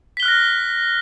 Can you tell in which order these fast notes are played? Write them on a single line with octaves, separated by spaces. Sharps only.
B6 G7 F#6 F6 A#6